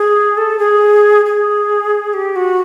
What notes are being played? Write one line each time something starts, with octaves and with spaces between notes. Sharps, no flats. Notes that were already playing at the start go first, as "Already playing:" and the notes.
Already playing: G#4
A4
G#4
G#4
G4
F#4